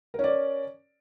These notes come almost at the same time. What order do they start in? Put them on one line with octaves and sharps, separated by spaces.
A#4 C#4 D5